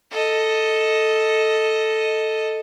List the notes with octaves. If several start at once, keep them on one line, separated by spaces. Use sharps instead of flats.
A4 D#5